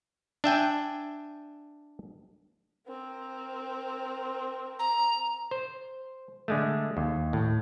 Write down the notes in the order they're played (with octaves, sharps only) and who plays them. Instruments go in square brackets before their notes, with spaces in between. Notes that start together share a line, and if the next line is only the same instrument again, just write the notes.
[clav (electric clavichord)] D4 E5 G5 G#5
[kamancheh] C4 A#4
[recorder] A#5
[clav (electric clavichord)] C5
D3 G#3 A3
D#2
A2